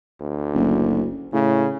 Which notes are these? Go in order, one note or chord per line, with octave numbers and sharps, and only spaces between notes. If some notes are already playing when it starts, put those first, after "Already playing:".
D2
F#1
A2 C#3